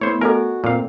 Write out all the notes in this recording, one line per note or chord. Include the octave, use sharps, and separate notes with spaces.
A3 B3 E4 C5 C#5
F#4 A4 A#4 D#5 G#5
A#2 C4 F5